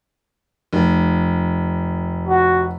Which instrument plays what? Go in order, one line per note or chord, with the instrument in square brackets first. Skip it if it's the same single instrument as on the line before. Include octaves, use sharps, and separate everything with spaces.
[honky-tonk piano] F1
[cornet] F#4